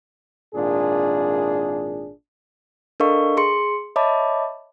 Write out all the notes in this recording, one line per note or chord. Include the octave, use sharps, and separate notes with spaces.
G#1 A#2 D4 G#4
D4 A4 A#4 D#5 F5 C#6
G#4 C6 C#7
C#5 D#5 E5 A5 B5 D6